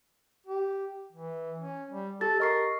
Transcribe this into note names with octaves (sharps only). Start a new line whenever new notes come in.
G4
E3
C#4
G3
G4 A4 A6
A#4 D#5 C#6 C7